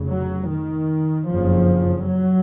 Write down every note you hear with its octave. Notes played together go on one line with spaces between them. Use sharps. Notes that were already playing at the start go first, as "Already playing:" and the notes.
Already playing: F1 C#3
F#3
D#3
F#1 F2 C#3 F3
F#3